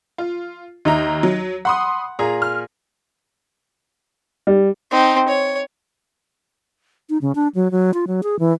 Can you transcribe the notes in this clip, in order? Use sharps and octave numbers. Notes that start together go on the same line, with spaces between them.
F4
D#2 D#4 E5 A#5
F#3
F#5 B5 C6 D#6
A#2 G#4 A#5
F6
G3
C4 D#4
C#5
D#4
C#3
D4
F#3
F#3
F4
F#3
G#4
E3